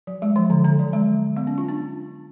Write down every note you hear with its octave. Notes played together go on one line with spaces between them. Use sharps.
F#3
G#3
F3
D3
D3
F#3
G#3
B3
C#4
F4
D4